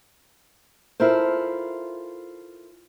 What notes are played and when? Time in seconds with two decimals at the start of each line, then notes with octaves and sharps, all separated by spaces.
1.00 E4 F4 A4 A#4 C5